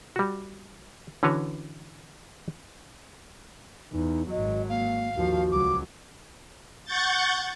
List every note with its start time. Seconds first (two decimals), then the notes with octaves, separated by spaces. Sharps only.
0.16 G3 F#4
1.23 D3 E3 C#4 F#4 B4 C#5
3.93 E2 D#4
4.30 G#1 F#3 D#5
4.69 A#3 F5
5.16 D#2 F3 F#4
5.51 C#2 F#3 D6
6.85 F#5 C#6 G6 A6